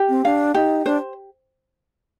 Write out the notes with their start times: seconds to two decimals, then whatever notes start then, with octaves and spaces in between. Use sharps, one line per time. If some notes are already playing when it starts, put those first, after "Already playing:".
Already playing: G4
0.09 C4
0.25 D4 F5
0.54 D#4 G4
0.86 D4 C5